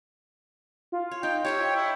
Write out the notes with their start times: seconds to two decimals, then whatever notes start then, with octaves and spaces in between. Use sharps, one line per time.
0.92 F4
1.11 C#5
1.23 D#4 G5
1.45 G4 C5 C#5 E5
1.59 G5
1.76 E4